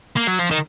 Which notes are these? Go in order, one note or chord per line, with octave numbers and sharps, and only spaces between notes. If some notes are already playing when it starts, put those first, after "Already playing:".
A#3
F#3
F3
D#3